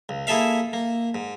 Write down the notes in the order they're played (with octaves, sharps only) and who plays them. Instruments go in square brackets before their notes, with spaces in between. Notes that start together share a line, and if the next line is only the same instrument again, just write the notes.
[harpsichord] C#2
A#3 E4 G#4 A4 E5 F5
A#3
G#2